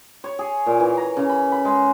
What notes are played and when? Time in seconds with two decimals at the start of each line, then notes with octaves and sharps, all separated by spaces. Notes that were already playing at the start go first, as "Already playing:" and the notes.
0.24 C#5
0.39 G#4
0.66 A#2
0.80 E3
0.97 A#5
1.17 C#3
1.29 B5
1.52 B5
1.65 G#3